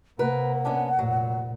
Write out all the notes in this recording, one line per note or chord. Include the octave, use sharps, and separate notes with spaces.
C3 A#3 A#4 B4 F#5
B3 C#4 D4
F1 A#2 F#3